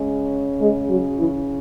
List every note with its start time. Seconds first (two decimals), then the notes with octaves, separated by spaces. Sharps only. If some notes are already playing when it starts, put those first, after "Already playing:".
Already playing: C#3 G#3 C#4
0.61 G#3 G#4
0.90 F#3 F#4
1.19 E3 E4